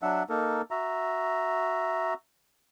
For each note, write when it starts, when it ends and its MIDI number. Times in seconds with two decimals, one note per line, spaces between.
0.02 0.23 54
0.02 0.23 62
0.02 0.23 76
0.02 0.23 78
0.29 0.62 58
0.29 0.62 63
0.29 0.62 69
0.29 0.62 70
0.71 2.14 66
0.71 2.14 76
0.71 2.14 82